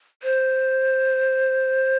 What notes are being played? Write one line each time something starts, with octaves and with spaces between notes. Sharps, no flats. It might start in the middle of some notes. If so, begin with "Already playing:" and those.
C5